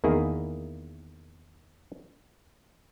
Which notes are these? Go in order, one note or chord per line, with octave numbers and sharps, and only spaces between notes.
E2 D#3 A#3 E4 G#4